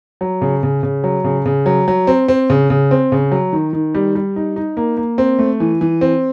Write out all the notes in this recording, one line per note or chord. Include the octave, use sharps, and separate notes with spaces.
F#3
C#3
C#3
C#3
F#3
C#3
C#3
F#3
F#3
C4
C4
C#3
C#3
C4
C#3
F#3
D#3
D#3
G3
G3
D#4
D#4
A#3
A#3
C4
A3
E3
E3
C4